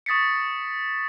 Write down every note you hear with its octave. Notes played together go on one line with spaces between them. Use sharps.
C#6 D#6 A6 B6 C#7